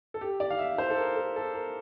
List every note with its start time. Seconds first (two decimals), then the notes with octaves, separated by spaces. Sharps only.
0.14 A4
0.21 G4
0.40 D5
0.50 F5
0.59 E5
0.78 C5
0.90 A4
0.97 A#4
1.17 A4
1.36 A4
1.55 A#4